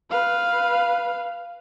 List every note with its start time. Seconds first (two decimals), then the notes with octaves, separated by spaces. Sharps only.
0.10 B4 F5